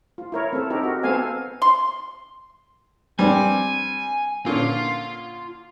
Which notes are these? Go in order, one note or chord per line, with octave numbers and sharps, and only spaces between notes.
F4
E4 A#4 C#5
C4 A4
C4 D#4 G4 A#4
F#4
B3 C4 A4 F5 G#5
C6
G3 C4 D4 G#5
A#2 D3 C#4 F4